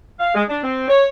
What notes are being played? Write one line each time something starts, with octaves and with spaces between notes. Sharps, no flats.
F5
G#3
D4
C4
C#5